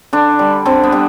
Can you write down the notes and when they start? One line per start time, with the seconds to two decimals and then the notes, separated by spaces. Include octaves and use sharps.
0.13 D3 D4
0.39 G3
0.65 D3 C4
0.84 B3
0.92 G3